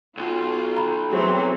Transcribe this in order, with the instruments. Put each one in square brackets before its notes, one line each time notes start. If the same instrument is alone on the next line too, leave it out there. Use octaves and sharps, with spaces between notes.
[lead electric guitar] B1 [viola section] F4
[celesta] A#5 B5
[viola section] E3 F#3 C4 [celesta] G#4